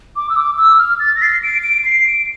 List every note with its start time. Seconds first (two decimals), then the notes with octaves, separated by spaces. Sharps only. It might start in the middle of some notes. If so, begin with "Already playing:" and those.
0.16 D6
0.30 E6
0.36 D6
0.58 E6
0.79 F6
1.00 A6
1.16 A#6
1.22 C7
1.43 D7
1.63 D7
1.85 C7
2.07 D7